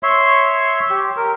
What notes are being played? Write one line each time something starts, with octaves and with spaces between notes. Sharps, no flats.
C#5 E5 C6
G4
A#4